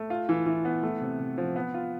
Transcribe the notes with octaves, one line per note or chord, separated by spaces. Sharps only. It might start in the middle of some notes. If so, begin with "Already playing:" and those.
Already playing: A3
F4
E3
E3
B3
A3
C3
C3
F3
B3
F4